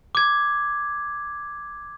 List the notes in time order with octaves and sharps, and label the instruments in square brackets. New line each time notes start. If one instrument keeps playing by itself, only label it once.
[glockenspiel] D6 G#6